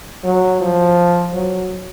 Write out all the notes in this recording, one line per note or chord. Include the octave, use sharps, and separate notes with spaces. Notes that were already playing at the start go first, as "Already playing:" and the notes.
F#3
F3
F#3